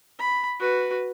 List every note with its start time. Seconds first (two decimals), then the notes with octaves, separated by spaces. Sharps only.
0.19 B5
0.60 F#4 B4